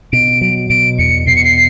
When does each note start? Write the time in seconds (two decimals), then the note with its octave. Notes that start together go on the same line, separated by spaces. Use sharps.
0.12 B2 D7
0.41 F#3
0.70 B2 D7
0.99 E2 C#7
1.27 B2 C7
1.36 C#7
1.44 C7